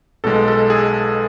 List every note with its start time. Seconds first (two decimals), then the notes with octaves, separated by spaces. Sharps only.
0.24 B1 B2 G#3 A4
0.48 A4
0.70 G#4